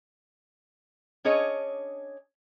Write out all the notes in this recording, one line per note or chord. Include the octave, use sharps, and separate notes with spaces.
C#4 D4 G#4 C#5 D#5